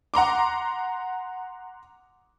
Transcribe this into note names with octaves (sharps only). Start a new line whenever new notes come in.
F#5 A#5 C6 D6